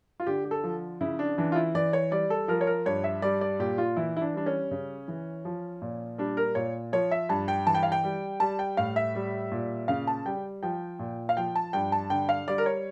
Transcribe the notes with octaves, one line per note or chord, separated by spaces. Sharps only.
F4
D3 G4
G4
A4
F3
C#3 E4
D4
E3 D4
F4
E4
E3 D5
C#5
G3 D5
A4
F3 A#4
C#5
A#4
G2 C#5
E5
G3 D5
D5
A#2 G4
F4
E3 E4
E4
D4
G3 D4
C#4
C#3
E3
F3
A#2
G3 D4
A#4
A#2 C#5
F3 C#5
E5
G2 A5
G5
E3 A5
G5
F5
G5
G3
G3 A5
G5
A2 F5
E5
G3
A#2
C#3 F5
A5
G3 G5
F3 G5
A#2
F5
F3 G5
A5
G2 G5
A5
D3 G5
F5
G3 D5
A#4
C#5